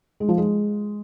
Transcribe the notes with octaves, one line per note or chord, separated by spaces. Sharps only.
G#3
F3
G#3